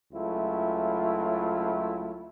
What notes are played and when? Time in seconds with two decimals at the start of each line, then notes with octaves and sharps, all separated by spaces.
0.13 C#2 F#3 A3 E4 F4